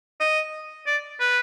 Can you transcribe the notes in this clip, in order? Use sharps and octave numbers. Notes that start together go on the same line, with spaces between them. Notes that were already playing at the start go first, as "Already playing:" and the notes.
D#5
D5
B4